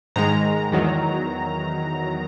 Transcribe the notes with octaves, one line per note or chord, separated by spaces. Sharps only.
G#2 D#3 G#3 A#5
E2 D#3 F#3